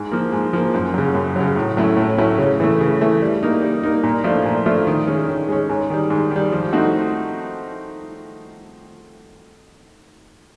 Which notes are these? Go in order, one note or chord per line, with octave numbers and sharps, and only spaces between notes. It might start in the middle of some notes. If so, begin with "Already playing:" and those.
Already playing: G#2
F3 A#3
G#2
F3 A#3
F#2
C#3 F#3
F#2
C#3 F#3
A2
F#3 A3 C#4 E4
A2
F#3 A3 C#4 E4
C#3
E3 A3
C#3
E3 A3
G3
A#3 D#4
G3
A#3 D#4
A#2
F3 A3 D4 F4
A#2
F3 A3 D4 F4
D#3
G#3 C#4
D#3
G#3 C#4
G#2
D#3 G3
G#2
D#3
G3
F3
A3 C4 D#4 F#4